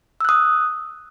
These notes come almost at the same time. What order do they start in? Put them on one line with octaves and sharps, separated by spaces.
E6 F#6 D#6